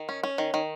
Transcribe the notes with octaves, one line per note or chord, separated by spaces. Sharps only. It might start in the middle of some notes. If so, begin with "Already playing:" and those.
Already playing: D#3
C#4
C#4
D#3
D#3